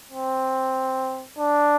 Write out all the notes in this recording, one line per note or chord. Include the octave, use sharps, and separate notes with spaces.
C4
D4